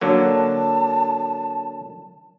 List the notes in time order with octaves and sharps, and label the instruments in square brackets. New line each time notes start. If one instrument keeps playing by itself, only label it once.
[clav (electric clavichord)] D3 F#3 A#3 [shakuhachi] A5